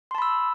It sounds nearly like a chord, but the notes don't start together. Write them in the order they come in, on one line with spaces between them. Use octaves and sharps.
C6 A5 B5 E6